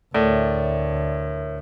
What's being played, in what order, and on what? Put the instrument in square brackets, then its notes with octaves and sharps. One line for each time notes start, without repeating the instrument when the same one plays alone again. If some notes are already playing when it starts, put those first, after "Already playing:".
[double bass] D2 [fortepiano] A2 [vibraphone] A#4 C#5 E5 [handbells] D5